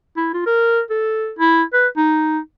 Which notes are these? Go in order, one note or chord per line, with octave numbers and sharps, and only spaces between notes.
E4
F4
A#4
A4
E4
B4
D#4